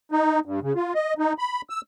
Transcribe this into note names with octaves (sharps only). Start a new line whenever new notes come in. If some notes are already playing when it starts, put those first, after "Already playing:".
D#4
G2
C#3
F4
D#5
D#4
B5
E6